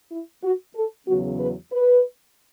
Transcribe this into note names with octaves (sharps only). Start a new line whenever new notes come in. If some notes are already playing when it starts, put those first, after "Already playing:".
E4
F#4
A4
E2 C#3 F#3 B3 F#4
B4
B4